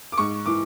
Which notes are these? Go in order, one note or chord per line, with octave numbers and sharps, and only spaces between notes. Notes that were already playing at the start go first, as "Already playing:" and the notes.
D6
G#2 C#6
E3 D6